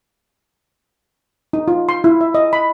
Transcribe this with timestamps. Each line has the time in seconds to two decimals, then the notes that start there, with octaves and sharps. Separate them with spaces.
1.53 D#4
1.68 F4
1.89 C6
2.04 E4
2.21 E5
2.35 D#5
2.53 B5